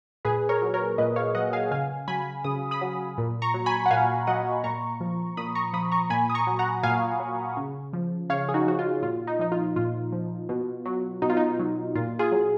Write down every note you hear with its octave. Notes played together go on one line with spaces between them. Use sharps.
A#2 G#4 B4
A#4 C#5
F#3
A#4 C#5
A#2 B4 D#5
C#5 F5
F#3 D#5 F#5
F5 G#5
C#3 F5 G#5
F#3 G#5 B5
C#3 D#6
B5 D#6
F#3
A#2
A#5 C#6
F#3
G#5 B5
F#5
A#2 F5 G#5
F#3 D#5 F#5
A#2 A#5 C#6
F3
A#2 B5 D#6
A#5 C#6
F3 B5 D#6
A#5 C#6
A#2 G#5 B5
D#6
A#5 C#6
F#3
F#5 A#5
A#2 F5 G#5
F#3
C#3
F3
C#3 C#5 F5
G#4
D#4 F#4
F3 F#4
F4
A#2 F4
D#4
F3 D#4
F4
A#2 F4
F3
B2
F#3
B2 D#4
F4
D#4
F#3
A#2 F4
F4 G#4
F#3